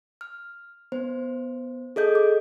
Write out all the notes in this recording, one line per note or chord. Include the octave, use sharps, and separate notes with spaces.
F6
B3 C5
G#4 A4 D#5 G6
D6